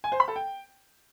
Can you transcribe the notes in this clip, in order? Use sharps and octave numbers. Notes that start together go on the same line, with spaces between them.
G#5
C5
B5
A4
G5